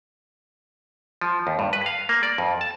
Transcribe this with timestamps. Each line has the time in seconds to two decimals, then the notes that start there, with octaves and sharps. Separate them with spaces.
1.21 F3
1.47 D#2
1.59 G2
1.73 B4
1.86 F5
2.09 A#3
2.23 D5
2.38 F2
2.61 A5